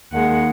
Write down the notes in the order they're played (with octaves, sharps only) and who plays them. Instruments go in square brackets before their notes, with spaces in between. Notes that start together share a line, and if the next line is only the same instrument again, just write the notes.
[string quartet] D#2 D#3 G#3 F#5